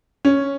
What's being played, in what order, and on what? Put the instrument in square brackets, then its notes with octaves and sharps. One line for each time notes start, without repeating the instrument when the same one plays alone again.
[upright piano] C#4